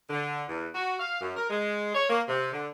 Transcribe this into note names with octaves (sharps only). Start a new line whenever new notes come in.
D3
E2
F#4
F5
F#2
A#4
G#3
C#5
A#3
C3
D3